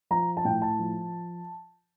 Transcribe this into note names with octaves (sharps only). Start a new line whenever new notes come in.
F3 A#5
A5
A2 G5
A5
F3